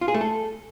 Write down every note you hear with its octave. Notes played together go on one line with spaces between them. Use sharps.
F4
G#4
A3
A4